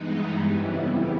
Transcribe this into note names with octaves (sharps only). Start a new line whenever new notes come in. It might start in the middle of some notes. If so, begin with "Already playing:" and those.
Already playing: G2 E3 G#3 B3 D#4
F2 C#3 E3 G3 B3 E4